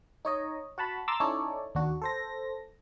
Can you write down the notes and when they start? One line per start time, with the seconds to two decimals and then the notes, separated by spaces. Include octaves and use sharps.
0.25 D#4 C#5 D#5
0.78 F#4 F#5 A5 B5
1.08 A#5 C6 D6 E6 A6
1.20 C#4 D#4 E4 A4 C#5 D5
1.75 D#2 D4 F#4
2.02 A4 C5 A#6